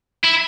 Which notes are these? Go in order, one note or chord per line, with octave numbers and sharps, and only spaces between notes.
E4